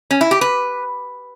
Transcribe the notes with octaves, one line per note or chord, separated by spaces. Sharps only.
C#4
E4
G4
B4